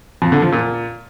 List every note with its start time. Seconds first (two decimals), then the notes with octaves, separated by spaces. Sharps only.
0.22 F2
0.32 D3
0.42 F3
0.52 A#2